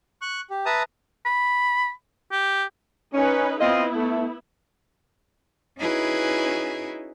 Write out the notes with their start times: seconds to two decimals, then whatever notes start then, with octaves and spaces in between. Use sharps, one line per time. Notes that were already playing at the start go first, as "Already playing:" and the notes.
0.22 C#6 F#6
0.50 G4
0.66 B4 E5 A5 A#5 D#6
1.26 B5
2.32 G4
3.14 C#4 D#4 B4
3.61 B3 C4 E4 F4 D#5
3.95 A3
5.78 C#4 D#4 E4 F#4 G#4 B4